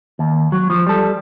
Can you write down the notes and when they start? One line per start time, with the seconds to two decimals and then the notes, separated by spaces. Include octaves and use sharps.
0.19 D#2
0.52 F#3
0.70 F3
0.87 G3 A4